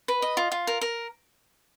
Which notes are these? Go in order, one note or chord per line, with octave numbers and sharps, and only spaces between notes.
B4
D#5
F4
F4
A#4
A#4